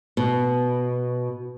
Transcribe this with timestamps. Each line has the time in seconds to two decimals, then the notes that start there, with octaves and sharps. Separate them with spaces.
0.17 B2